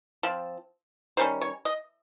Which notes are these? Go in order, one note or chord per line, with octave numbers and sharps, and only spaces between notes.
F3 C4
D#3 G3 C#4 C5
C#5
D#5